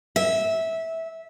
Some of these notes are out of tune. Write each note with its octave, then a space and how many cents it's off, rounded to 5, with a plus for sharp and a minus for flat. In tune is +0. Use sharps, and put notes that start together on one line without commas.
E5 -15